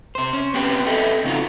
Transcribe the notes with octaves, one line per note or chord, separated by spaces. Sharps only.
C3 C5
C#4
B3 C4 G4 B4 C5 G5
A4 B4 D#5 E5 G5
C#3 C4 D#4 F4 F#4